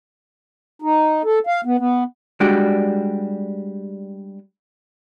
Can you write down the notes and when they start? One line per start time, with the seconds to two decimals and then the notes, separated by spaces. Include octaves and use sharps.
0.82 D#4
1.25 A4
1.47 F5
1.65 B3
1.78 B3
2.40 G3 G#3 D4 F#4 G4